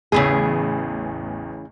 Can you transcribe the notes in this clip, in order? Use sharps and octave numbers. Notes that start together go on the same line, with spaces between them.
A1 E2 C#3 E3 G#4